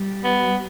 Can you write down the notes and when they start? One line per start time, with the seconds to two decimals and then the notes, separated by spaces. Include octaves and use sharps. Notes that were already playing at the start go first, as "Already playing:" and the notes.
Already playing: G3
0.24 B3